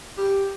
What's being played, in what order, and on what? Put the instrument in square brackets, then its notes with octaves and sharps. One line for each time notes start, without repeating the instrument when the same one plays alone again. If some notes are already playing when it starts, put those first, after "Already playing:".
[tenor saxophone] G4